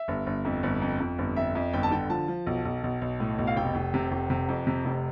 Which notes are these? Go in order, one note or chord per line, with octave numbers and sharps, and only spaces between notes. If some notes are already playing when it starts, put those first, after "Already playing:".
Already playing: E5
G1
G1
F2
G1
F2
F2
G1
F2 E5
F2
G1 G5
A5
D3 G5
F3 A5
F3
B1
B1
B1
B1
A2
B1
F5
F1 G5
F1
C3
F1
C3
F2
C3
F1